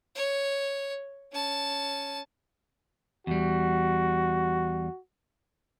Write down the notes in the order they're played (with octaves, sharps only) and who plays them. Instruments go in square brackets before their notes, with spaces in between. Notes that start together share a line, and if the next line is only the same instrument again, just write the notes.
[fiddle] C#5
C#4 A5
[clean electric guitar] E2 G3 [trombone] F#4